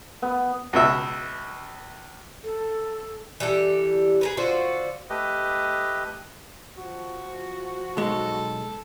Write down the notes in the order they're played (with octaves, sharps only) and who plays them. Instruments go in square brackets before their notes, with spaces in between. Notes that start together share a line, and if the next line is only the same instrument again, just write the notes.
[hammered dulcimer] B3
[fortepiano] C#2 B2 E5
[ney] A4
[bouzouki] E3 G3 G4 A4
G#4 A#4 B4
D3 F4 F#4 C5
[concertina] A3 G4 B4 D#5
[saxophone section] F3 F#4
[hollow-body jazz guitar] B1 G#3 [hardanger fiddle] A4